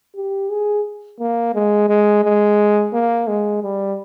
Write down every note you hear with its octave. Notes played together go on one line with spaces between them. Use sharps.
G4
G#4
A#3
G#3
G#3
G#3
A#3
G#3
G3